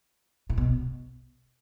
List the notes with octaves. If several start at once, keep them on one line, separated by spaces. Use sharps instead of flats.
A2
B2